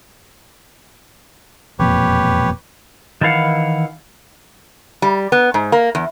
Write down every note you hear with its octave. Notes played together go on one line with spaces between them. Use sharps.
E1 F2 A#2 G4 B4 C#5
D#3 E3 E4 F5 F#5
G3
B3
G#2
A#3
E2